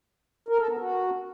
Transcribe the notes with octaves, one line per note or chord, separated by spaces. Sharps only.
A#4
A4
B3
F#4